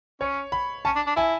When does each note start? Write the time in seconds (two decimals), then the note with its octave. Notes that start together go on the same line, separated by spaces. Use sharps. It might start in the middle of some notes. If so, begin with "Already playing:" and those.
0.21 C#4 C#5
0.52 B5
0.85 C#4 A5
0.96 D4
1.07 D4
1.16 E4 G#5